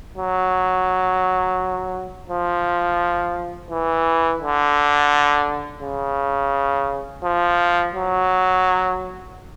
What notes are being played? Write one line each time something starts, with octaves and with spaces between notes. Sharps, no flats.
F#3
F3
E3
D3
C#3
F3
F#3